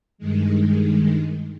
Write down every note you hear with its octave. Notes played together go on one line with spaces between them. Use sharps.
G2 D#3 G#3